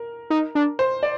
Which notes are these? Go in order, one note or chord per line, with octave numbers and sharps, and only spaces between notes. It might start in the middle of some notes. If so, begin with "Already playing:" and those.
Already playing: A#4
D#4
D4
C5
D5